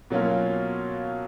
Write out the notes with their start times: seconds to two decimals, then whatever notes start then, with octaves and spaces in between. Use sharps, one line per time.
0.10 B2 F#3 A#3 C#4 F4